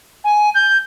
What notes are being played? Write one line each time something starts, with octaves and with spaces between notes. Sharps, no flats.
G#5
G6